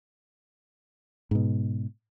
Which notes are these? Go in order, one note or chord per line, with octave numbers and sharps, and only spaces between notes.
G#2 B2